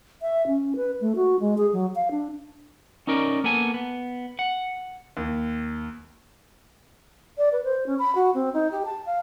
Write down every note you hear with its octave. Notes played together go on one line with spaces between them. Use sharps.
E5
C#4
B4
A3
F#4
G#3
G#4
F#3
F5
D4
C#4 D#4 A#4 D5
A#3 B3 A4 G#5 A5
B3
F#5
D#2
D5
B4
C5
C#4
B5
F#4
C4
D#4
G4
A5
F5